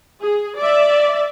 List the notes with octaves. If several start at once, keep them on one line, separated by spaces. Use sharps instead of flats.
G#4
D5 E5